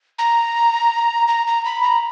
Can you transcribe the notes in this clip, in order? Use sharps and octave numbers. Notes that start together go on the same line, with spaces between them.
A#5
A#5
A#5
B5
A#5